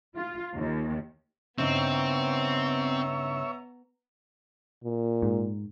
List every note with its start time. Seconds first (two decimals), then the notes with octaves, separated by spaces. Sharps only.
0.16 F4
0.57 D#2
1.58 G2 C#3 B3 C4 D#4 C#5 E5 A#5
4.84 A#2
5.22 G#2